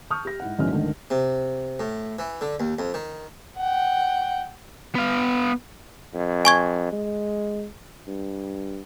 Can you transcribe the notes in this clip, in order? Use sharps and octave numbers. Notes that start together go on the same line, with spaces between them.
A5 C#6 D#6 F6 G6
G4 A#6
G#2 E4 F#5
A#1 G#2 E3 F#3 C#4 F6
G#1 D2 D3 D#3
C3
A2
E3
D3
D#2
F2
D#3
F#5 G5
B3 F5
F2
G#5 C#6 G#6
G#3
G2